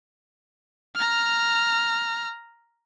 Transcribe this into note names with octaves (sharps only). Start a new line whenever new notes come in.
A#5 F6